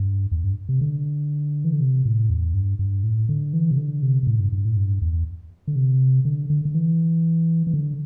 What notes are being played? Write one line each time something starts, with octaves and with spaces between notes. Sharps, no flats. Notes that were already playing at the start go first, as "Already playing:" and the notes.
Already playing: G2
E2
G2
C3
D3
E3
D3
C3
A2
E2
G2
G2
A2
D3
E3
C3
D3
C3
C3
A2
G2
G2
A2
G2
E2
D3
C3
D3
D3
D3
E3
E3
D3